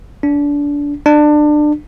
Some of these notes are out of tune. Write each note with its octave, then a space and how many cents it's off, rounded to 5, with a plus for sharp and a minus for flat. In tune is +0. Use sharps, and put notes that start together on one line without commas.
D4 -25
D4 +25